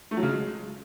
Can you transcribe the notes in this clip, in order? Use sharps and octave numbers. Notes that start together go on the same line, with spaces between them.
A3
F#3
C#3
G#3